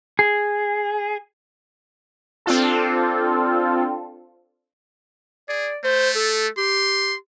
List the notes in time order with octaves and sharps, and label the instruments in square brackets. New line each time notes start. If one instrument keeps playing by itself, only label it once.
[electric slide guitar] G#4
[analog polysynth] C4 D4 F4 A4
[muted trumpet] G#4 [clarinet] D5
[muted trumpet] A3 [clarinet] C5
[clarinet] A4
[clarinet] G4 [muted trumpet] C6